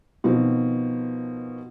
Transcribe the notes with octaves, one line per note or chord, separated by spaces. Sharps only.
B2 D#3 F3 C4